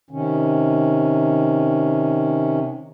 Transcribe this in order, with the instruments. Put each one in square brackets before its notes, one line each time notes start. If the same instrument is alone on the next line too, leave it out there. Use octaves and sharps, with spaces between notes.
[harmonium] C3 D#3 C#4